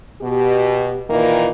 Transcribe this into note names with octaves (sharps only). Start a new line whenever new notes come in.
B2 G4
A#2 D#3 E3 A#3